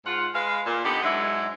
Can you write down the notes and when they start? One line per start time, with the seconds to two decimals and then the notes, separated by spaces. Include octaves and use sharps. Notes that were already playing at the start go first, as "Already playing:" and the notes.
0.05 G#2 F4 F#5
0.34 G#3 B4 F5
0.66 A#2
0.84 D3 B3 D#4 G4 D5 D#5
1.02 G#2 F#3 G#3 D4 E4